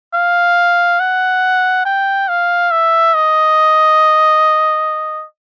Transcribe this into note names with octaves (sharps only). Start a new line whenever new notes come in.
F5
F#5
G5
F5
E5
D#5